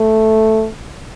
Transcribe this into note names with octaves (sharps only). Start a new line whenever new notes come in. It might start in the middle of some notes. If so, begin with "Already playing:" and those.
Already playing: A3